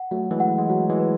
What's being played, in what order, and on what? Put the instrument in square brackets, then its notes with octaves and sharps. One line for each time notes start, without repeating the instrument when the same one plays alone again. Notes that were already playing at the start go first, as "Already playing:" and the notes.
Already playing: [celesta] F#5
[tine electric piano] F#3 A3 [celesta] F#4
[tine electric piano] E3 G#3
[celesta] F#5
[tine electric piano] G#3
[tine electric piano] F#3 [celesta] F#4
[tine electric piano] E3 G#3
[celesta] B4